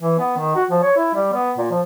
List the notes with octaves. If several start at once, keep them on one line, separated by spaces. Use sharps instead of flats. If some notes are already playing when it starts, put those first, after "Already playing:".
E3
B3
D#3
F#4
F3
C#5
E4
G3
B3
A#2
F3